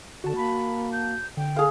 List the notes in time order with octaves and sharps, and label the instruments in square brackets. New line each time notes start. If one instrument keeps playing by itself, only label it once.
[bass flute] D3 [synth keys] F#4 A5
[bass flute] A#3 [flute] B5
[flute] G6
[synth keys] D3 [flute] G5
[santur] G#4 F5 [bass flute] A4